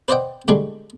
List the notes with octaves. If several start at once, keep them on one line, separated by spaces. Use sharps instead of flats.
B4 C5 D5 D#5 F#5 G5
A2 D3 G3 G#3 D4